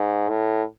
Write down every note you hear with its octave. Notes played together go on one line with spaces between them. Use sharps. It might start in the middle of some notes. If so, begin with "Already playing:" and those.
Already playing: G#2
A2